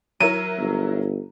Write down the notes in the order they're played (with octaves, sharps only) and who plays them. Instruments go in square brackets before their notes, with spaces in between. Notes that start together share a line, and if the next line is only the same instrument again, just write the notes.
[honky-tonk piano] F#3 E4 A#4 [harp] D#7
[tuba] G1